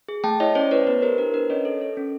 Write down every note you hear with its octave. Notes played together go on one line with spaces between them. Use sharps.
G#4
A3 G5 A5
E4 C#5 D#5
C#4 C5 D5
E4 B4 C#5
B3 B4
G4 A#4 C5
D4 A#4
D4 B4
C#4 C#5 D#5
A4
A4
C#4